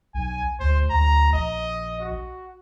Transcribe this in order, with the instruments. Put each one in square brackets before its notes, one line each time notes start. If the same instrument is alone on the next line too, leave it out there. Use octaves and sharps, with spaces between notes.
[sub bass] B1 [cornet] G#5
[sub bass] D2 [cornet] C5
[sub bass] D2 [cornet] A#5
[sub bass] A#1 [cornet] D#5
[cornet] F#4